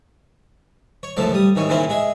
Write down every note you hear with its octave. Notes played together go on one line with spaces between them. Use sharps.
C#5
C#2 F#2 A2 D3 F3 A5
G3 D#6
G#2 D#3 E3 C#5
A#2 C#3 E3 C4 C#4 E4
G#3 G#4 E5